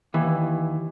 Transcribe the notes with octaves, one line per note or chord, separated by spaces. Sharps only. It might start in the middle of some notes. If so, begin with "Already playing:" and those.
D#2 E3